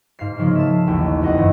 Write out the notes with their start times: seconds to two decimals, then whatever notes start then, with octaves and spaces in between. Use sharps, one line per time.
0.19 G#2 F5 C7
0.38 C#3 F3 G#3 A#3
0.55 E5 A5
0.87 A1 D#2
1.22 F2 D#5 F#5
1.38 G2 E3 G#3